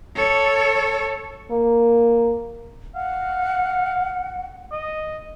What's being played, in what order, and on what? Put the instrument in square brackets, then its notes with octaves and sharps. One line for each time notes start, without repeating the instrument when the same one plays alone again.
[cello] A4 C#5
[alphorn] A#3
[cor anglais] F5 [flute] F#5
[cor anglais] D#5